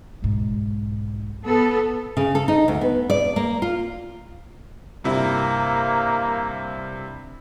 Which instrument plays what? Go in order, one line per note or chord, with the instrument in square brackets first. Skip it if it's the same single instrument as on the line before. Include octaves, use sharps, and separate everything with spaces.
[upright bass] B1 G#2
[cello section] B3 A4
[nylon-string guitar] C#3
A4
D#4
D2
B3
D5
A#3
F4
[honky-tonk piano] G2 C3 E4 [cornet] A#3